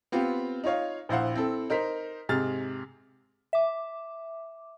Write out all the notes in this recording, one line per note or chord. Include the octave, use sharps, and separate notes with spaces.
B3 C4 F4 G4
D#4 F4 C#5 F5
A#1 E4 C5 F5 F#5
C4 E4 A4
D#4 A#4 C5 B6
G#2 C3 G#4 F6 A6
E5 D6